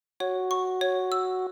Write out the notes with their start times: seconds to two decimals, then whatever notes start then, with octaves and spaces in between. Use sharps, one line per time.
0.20 F#4 C#5
0.51 C#6
0.81 C#5
1.12 E6